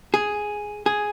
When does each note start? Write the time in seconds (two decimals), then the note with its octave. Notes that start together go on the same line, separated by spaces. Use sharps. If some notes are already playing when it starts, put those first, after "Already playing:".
0.14 G#4
0.86 G#4